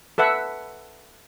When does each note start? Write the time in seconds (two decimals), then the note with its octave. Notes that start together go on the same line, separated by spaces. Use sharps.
0.18 A4 B4 E5 F#5